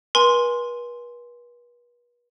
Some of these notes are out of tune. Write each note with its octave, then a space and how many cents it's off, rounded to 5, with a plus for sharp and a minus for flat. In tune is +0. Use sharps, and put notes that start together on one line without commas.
B4 -40 G#5 +0 C6 +0